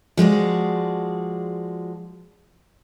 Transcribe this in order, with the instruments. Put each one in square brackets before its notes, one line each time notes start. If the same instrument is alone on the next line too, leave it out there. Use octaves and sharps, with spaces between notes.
[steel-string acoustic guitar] F3 G#3 F#4 D5